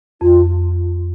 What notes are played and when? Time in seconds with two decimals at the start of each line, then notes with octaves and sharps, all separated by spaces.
0.21 F2 F4